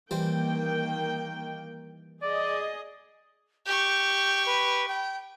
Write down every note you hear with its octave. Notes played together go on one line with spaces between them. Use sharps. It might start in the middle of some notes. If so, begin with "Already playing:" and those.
D#3 E3 G3 A#3 C5 G5
G#4 D5 D#5
G4 C#6 G6
B4
G5